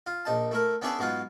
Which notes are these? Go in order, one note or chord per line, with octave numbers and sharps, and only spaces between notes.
F4
A#1 D#4 A5
A3 E4 A#4
B3 C#4 D4 E4 G#4 B4
G#2 F#3 B3 F4